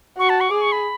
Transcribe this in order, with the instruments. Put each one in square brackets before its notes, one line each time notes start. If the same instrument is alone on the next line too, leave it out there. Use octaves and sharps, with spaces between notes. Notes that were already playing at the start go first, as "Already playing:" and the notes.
[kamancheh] F#4 [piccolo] C#6
[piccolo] A5
C#6
[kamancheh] G#4 [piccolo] D6
[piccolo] C#6
B5